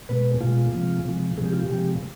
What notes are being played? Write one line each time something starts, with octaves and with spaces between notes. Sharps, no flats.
B2 G#3 B4
B2 G#3 F4
C3 F3 G#3
C3 F3 G#3
C3 F3 G#3 G#4
G4
F4
G4
C3 F3 G#3